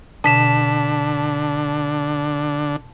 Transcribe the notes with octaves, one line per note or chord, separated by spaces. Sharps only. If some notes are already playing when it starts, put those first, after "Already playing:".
B2 D3 A5 B6 E7